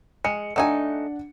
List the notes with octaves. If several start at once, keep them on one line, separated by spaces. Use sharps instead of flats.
G#3 C#7
A3 D4 D#4 F#5 G#5